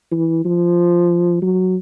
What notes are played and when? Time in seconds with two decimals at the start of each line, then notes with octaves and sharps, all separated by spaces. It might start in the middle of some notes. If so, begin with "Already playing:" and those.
0.12 E3
0.45 F3
1.42 F#3